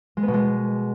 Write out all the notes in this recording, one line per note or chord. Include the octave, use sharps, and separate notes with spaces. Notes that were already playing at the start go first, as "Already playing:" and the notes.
G#3
B3
B2
G#3